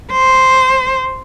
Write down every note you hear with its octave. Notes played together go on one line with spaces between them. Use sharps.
C5